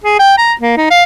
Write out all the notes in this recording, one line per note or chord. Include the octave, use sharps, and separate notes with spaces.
G#4
G5
A#5
A#3
D#4
F5